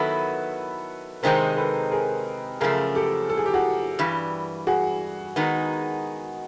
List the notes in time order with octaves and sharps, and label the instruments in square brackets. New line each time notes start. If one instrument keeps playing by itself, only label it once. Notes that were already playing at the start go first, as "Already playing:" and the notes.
Already playing: [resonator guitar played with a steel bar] D#3 F#3 B3 E4 [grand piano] A4 B4
[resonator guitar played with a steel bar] C3 D#3 G#3 C4 D#4 [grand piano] A#4 C5
[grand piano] A4 B4
G#4 A#4
[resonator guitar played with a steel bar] F#2 C#3 F3 A3 [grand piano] G#4 A#4
[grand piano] G4 A4
A4
G#4
G4
F#4 G#4
[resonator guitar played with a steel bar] G2 E3 G3
[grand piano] F#4 G#4
[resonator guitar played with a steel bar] D#3 G#3 B3 D#4